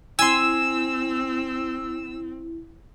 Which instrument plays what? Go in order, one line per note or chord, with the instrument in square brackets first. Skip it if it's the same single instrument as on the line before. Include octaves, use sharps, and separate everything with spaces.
[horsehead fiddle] C4 [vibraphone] E4 [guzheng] G#5 C6 [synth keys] E6